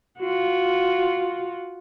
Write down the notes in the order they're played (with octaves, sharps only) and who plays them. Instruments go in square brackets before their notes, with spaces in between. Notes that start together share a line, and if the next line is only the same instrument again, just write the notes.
[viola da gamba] F4 F#4